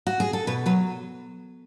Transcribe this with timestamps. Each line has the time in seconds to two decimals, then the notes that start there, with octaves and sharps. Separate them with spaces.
0.07 F#4
0.20 G#4
0.33 A4
0.47 B2 B4
0.66 F#3 B4